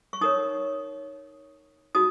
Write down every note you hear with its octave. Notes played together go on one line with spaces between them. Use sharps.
C#6
D#4 A#4 C#5 D#6
D#4 F#4 D#6